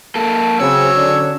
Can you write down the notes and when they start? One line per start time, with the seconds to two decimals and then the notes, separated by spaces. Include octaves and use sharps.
0.15 A#3 A4
0.60 C#3 F#3 C4 C#5 E6
0.95 D3 C#4 D4